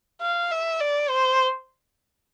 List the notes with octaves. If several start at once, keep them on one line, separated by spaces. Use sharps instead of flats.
F5
E5
D5
C5